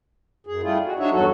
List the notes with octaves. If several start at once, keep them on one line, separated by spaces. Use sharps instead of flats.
F#2 G#4
G3 A3 E4 F4 G#4
G#3 F#4
D4 D#4 F#4 C#5 E5
E2 G2 F#3 F#4 A4